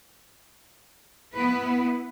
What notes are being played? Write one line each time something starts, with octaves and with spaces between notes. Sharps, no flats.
B3 E4 B4